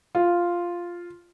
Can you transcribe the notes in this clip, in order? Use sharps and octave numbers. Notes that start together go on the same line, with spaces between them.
F4